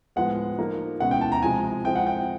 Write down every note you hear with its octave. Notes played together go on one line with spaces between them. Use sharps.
A2 F3 G#3 B3 F#5
F3 A#3 D#4
B2 G#3 C#4 E4 F#5
G5
A5
A#5
C3 F3 G#3 G#5
F3 G#3 C4 E4 G5
F#5
G5